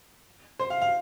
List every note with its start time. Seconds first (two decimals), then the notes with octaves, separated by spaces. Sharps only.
0.59 C5
0.70 F5
0.82 F5